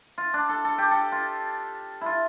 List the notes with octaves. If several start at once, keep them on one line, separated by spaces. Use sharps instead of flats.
F4
D4
A4
A4
G4
A4
F4
E4 F4